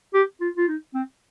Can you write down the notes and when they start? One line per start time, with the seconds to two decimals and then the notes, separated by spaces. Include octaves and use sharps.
0.14 G4
0.41 F4
0.57 F4
0.68 D#4
0.94 C4